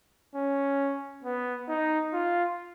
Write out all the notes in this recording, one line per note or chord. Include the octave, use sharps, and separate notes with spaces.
C#4
B3
D#4
F4